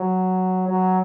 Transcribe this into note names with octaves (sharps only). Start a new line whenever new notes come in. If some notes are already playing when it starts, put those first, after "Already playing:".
Already playing: F#3
F#3